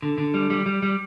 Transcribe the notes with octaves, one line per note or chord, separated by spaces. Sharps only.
D3
D3
G3
G3
G3
G3